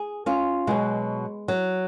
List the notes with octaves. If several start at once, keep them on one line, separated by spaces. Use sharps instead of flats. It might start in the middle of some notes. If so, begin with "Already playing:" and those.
Already playing: G#4
C#4 F4
B2 F#3 G#3
F#3